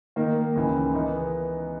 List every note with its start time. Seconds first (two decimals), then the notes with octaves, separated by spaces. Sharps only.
0.16 D#3 A#3 D#4 A#4
0.56 C#2 C#3 E3
0.94 E3 B3 D#4 A#4